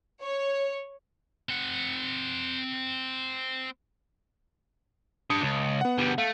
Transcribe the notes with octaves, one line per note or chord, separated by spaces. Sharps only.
C#5
C4 F#5
D4 A5 B5 D#6 C#7
C#2
B3 F#5
D2 G3
A3 F5